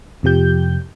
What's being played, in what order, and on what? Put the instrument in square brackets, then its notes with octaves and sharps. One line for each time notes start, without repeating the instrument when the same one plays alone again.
[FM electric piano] F2 C3 F3 G4 G6